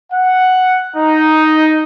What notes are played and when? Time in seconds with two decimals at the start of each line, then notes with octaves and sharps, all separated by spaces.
0.13 F#5
0.97 D#4